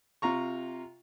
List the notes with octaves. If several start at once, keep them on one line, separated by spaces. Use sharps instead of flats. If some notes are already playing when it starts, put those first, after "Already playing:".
C3 F4 A#5 C#6